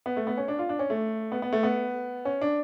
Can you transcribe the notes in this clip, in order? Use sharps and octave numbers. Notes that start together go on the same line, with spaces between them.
B3
A3
B3
C#4
D4
F4
D4
C#4
A3
B3
B3
A3
B3
C#4
D4